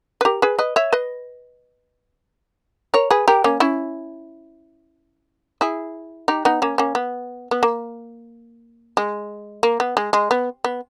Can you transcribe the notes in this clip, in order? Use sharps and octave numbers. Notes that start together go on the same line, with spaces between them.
B4
G4 A#4
G#4 B4
B4 D#5
C#5 E5
B4 D#5
A#4 C#5
G#4 B4
G4 A#4
A#3 C#4
C#4 E4
E4 G#4
D#4 G4
B3 D#4
A#3 C#4
A#3 C#4
B3
B3
A#3
G#3
A#3
B3
G#3
G#3
B3
B3